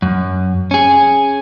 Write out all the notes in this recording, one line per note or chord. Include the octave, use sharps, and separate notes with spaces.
F#2
C#4 G#4